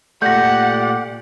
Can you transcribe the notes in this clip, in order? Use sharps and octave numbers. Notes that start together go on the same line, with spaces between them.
A#2 A3 G4 D5 F#5 G6 A#6